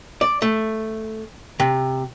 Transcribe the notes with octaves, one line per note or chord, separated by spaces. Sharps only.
D5
A3
C3